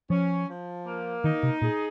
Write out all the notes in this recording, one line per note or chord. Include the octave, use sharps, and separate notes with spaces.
F3 C#4
F3
A#3
D#3 D#4
C3
A#2 G#4